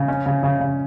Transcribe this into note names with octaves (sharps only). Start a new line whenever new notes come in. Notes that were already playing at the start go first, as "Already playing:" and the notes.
Already playing: C#3
C#4
C#3
C#3
C#3